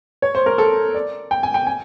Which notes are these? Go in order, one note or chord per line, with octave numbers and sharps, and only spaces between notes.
C#5
C5
A#4
A4
D5
G5
G#5
G5
G#5